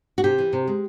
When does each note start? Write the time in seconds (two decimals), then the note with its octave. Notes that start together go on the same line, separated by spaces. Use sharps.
0.18 F#4
0.24 C3 G4
0.38 E3
0.53 C3
0.68 G#3